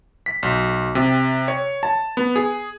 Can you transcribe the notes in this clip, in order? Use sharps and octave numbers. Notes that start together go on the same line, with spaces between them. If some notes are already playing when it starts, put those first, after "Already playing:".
B6
B1
C3
C#5
A5
B3
G#4